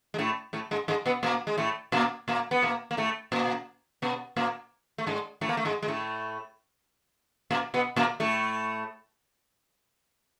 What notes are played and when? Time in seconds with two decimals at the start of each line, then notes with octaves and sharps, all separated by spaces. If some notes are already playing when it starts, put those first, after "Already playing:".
0.14 G#3
0.18 A2 A3
0.53 A2 A3
0.71 G#2 G#3
0.88 G#2 G#3
1.06 B2 B3
1.23 A#2 A#3
1.47 G#3
1.58 A2 A3
1.92 A#2 A#3
2.28 A#2 A#3
2.51 B3
2.62 A#2 A#3
2.91 A#3
2.97 A2 A3
3.32 A#2 A#3
4.02 B2 B3
4.36 A#2 A#3
4.98 A3
5.07 G#2 G#3
5.41 A2 A3
5.49 A#3
5.57 A3
5.65 G#2 G#3
5.83 G#3
5.88 A2 A3
7.51 A#2 A#3
7.74 B2 B3
7.96 A#2 A#3
8.20 A2 A3